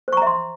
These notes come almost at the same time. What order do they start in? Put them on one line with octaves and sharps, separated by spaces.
C5 C#6 A#5 E5 C6